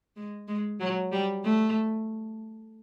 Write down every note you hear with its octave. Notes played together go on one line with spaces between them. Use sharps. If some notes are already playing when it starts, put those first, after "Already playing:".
G#3
G#3
F#3
G3
A3